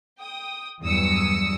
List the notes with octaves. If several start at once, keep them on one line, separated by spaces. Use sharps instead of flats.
G5 D#6
E2 G2 F#3 D#6 E6 C#7